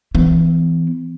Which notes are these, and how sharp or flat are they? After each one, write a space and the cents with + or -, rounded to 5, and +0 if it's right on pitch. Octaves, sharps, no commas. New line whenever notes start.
E3 +0 B3 +45